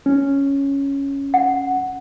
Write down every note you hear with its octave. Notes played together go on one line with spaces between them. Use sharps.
C#4
F#5